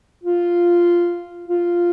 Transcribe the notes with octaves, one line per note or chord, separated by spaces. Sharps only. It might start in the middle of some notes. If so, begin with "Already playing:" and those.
F4
F4